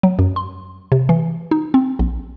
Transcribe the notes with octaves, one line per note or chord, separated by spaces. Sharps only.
F#3
F#2
C6
C3
E3
D#4
C4
A#1